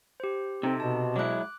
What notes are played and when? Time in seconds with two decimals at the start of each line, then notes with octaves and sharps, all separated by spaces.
0.20 G4 C5
0.63 C3 C4 D#4 A4
0.80 B2 A5
1.16 F#3 G#3 E4 D6 F#6